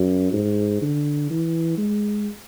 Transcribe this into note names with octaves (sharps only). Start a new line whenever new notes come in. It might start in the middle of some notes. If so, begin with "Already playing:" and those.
Already playing: F#2
G#2
D3
E3
G#3